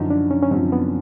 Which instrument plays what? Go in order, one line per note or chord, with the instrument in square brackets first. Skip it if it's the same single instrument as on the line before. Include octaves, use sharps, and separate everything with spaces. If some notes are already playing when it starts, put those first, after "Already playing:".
Already playing: [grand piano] F#2 D3 F3 [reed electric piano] D#4
[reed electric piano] D4
C#4
C#4
[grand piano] F#2 D3 F3 [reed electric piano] C4
[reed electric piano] B3